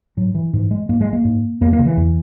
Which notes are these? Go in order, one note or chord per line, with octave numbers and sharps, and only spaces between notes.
G#2 F#3
E3
G#2 E3
G#3
G#2 A#3
G#3
A#3
G#2
E2 A#3
A#3
C#3
E3
E2